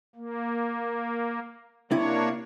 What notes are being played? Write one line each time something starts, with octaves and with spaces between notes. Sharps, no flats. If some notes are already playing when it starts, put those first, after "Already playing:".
A#3
C3 A#3 D4 E4 C#5